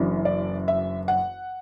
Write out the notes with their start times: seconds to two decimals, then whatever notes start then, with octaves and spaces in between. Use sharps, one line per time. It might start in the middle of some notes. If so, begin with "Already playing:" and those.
Already playing: F#1 F#2 E3 D4
0.25 D5
0.68 E5
1.08 F#5